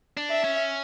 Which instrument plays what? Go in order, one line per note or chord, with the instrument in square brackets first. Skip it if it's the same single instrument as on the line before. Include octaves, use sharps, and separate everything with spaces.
[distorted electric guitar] D4
[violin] E5
[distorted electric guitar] C#4